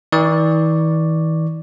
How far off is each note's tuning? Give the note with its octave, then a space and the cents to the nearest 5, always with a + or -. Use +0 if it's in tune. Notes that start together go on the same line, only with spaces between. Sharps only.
E3 -45 D5 +0 C#6 +0